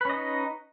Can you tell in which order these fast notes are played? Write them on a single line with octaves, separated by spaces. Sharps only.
B4 C#4 D#5 D#4